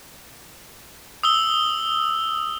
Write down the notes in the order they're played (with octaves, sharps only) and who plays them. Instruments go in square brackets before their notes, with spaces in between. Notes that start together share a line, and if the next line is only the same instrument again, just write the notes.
[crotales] D#6 E6 G7